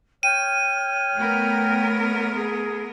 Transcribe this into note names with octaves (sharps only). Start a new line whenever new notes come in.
C#5 G5 F6 D#7
A3 B3 A#4
G#4